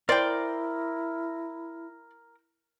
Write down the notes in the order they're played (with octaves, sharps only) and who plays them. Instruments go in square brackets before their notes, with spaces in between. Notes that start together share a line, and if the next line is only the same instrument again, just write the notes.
[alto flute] E4 [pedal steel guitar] A#4 D6 [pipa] C5 G5 [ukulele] D5